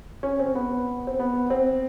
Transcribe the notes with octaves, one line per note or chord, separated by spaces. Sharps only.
C#4
C4
B3
C4
B3
C4